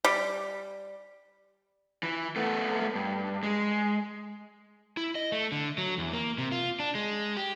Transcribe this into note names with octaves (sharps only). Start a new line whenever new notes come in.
G3
E3
A3 B3
G2
G#3
E4
D#5
A3
D3
F#3
E2
A#3
C3
F4
D4
G#3
G4